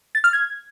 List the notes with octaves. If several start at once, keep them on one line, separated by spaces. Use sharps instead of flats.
A6
F6
G#6